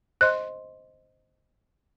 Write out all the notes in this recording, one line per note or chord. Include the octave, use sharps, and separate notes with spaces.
C5 D#5 C6 F#6